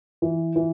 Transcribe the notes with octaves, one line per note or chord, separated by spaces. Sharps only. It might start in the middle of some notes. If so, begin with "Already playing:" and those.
E3
E3